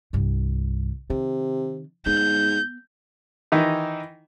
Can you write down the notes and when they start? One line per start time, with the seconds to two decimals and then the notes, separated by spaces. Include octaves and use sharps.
0.13 C2 G2
1.10 C3 D#3
2.06 G#2 B3 G6
3.52 D#3 E3 D#4 E4